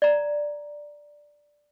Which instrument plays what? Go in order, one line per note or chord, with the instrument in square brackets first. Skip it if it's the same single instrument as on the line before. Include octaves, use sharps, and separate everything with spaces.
[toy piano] D5 A#5